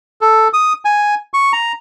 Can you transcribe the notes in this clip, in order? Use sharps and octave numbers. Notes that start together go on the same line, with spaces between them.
A4
D#6
G#5
C#6
A#5